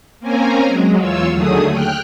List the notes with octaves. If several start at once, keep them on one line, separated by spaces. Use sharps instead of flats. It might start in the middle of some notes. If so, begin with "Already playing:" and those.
A#3 C4 C#4 G#5 A#5
F#3 G#3
E2 F4 C#5 E6
D#2 D3 F#3 A3 G#4 D#6
G5 F6 F#6